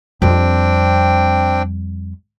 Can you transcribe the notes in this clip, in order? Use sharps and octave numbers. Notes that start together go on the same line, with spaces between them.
F2 G3 C4 D4 G5